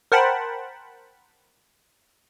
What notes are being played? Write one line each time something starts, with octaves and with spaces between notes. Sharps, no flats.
A#4 C5 F#5 G5 A5 B5